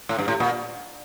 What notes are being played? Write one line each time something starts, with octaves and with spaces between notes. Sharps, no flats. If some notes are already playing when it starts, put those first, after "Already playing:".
A2
G2
A2
A#2